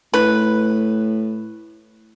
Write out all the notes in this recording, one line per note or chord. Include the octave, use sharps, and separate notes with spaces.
A2 B4